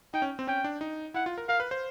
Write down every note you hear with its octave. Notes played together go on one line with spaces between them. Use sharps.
D#4 G5
C#4
C4
C#4 G5
D4
D#4
E4 F#5
F4
A#4
A#4 F5
B4
C5